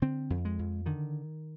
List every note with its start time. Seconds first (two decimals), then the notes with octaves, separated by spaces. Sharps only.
0.02 D3 C4
0.30 F2
0.45 G#3
0.59 F2
0.86 D3 D#3